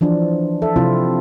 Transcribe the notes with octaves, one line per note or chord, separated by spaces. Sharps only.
E3 F3 D4
A4 E5
C3 F3 C4 E4 F4